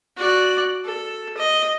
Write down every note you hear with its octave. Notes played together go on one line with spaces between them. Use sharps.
F#4 D5
A4
D#5